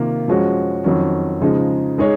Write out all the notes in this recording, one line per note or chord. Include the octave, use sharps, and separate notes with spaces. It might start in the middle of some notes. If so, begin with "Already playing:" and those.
Already playing: C3 D#3 A#3 F4
F#2 F3 G#3 C#4 F#4
F2 D#3 F#3 C#4
C#3 F3 G#3 D#4
G#3 D#4 G#4 C#5